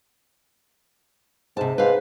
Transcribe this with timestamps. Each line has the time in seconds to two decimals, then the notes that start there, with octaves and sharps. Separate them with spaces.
1.57 G#2 C3 A5
1.78 G#2 B4 F5